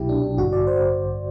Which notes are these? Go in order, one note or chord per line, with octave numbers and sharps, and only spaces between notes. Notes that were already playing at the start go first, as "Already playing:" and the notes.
Already playing: C2 B2 F#3 E4 G4
D4
D4
A1 G2 D3 F#4
D5
C5